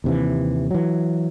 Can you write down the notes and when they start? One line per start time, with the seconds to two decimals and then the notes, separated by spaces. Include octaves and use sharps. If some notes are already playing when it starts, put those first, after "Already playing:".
0.04 D#2 C3 E3
0.71 E3 F#3